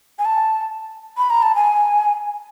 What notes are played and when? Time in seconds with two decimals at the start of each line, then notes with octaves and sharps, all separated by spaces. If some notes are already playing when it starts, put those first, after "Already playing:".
0.19 G#5
0.25 A5
1.18 B5
1.30 A#5
1.43 A5
1.55 G#5